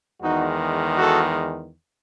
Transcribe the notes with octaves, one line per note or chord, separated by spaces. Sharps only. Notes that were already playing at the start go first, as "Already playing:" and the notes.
E2 D#3 G#3 D#4 F#4
F#4 A4